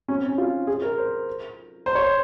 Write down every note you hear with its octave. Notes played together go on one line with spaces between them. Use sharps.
C#4
C4
C#4
F4
G#4
A#4
C5
C5
C#5
C5